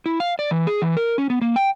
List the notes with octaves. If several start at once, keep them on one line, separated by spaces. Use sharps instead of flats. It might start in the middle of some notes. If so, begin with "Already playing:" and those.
E4
F5
D5
E3
G#4
E3
A#4
C#4
B3
A#3
G5